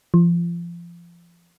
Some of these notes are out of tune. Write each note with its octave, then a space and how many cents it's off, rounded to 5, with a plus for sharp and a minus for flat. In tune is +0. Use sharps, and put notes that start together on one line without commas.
F3 -30